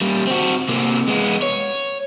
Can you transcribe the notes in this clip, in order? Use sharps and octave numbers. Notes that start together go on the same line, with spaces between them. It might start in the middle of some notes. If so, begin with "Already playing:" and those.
G3 A#3
C4 F#4
C3 A#3
G#3 B3
C#5